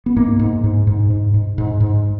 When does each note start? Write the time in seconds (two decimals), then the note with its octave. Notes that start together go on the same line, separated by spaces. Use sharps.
0.06 B3
0.16 G#2 A#3
0.39 G#2
0.64 G#2
0.87 G#2
1.10 G#2
1.34 G#2
1.58 G#2
1.80 G#2